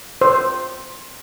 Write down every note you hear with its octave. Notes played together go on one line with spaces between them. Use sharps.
C5